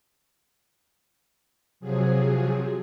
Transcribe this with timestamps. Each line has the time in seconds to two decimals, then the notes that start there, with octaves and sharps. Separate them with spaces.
1.80 C3 F3 F#3 G#4